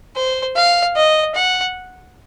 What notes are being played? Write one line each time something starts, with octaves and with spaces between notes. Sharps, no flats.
C5
F5
D#5
F#5